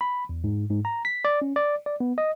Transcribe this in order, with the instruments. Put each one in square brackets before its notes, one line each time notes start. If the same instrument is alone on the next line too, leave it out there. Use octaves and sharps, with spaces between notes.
[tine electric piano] B5
E2
G#2
G#2
A#5
B6
D5
C#4
D5
D5
B3
D#5